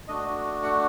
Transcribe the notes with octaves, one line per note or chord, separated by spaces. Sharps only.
A3 D4 F#4 D#5
F#5